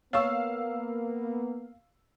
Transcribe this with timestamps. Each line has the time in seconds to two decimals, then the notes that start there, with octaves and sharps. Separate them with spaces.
0.13 A#3 B3 C#5 F5 C#6 E6